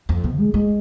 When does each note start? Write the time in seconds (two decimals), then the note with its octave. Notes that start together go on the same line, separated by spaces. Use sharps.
0.09 F2
0.24 B2
0.38 G#3
0.54 G#3